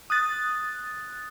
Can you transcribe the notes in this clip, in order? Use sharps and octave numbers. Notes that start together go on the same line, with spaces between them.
D#6 F#6 A6